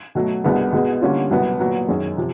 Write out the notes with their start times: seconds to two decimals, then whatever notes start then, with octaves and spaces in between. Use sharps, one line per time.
0.15 B2 F#3 A3
0.44 C2 B2 G#3 B3 D4
0.73 B2 G#3 B3
1.01 D3 G3 A#3 C#4 F4
1.31 C2 B2 F#3 B3
1.59 A#2 F#3 B3
1.88 F#2 D#3 G#3 C#4
2.17 C3 F3